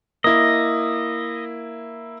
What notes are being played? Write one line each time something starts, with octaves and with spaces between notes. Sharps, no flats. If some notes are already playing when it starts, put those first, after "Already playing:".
A#3 E4 D#5